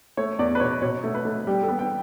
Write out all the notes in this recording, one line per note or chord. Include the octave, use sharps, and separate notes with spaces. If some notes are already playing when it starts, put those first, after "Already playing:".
A3 C#5
E2 D5
B4
B2 C#5
B2 C#5
A3
B4
A3
G3 G4
A4
B3
G5